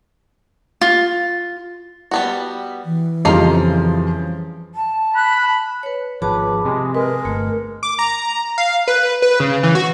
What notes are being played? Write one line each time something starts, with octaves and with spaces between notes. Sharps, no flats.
F4
G3 B3 F#4
E3
F2 C#3 F3 G3 D#4 C5 F5
A5
B5 F#6
B4 C#5
G#1 F3 G#4 B4 A5 D6
C3 G#3
G#3 A#4 B4
G1 A3
D6
A#5
F5
B4
B4
C#3
E3
F#4